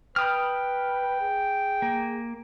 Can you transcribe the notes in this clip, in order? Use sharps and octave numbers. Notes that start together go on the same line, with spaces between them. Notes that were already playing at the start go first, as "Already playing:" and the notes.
B4 G5 B5 D#6 F6
G#4
A#3